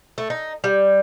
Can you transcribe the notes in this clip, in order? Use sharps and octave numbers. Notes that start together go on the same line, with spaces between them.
A3
D#4
G3